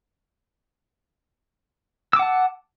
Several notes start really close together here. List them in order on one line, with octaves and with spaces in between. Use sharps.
E6 D6 F#5 A5